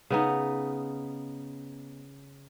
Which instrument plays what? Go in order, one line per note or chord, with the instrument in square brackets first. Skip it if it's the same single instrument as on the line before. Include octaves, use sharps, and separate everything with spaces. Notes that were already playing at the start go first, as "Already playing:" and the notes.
[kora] C#3 B3 D#4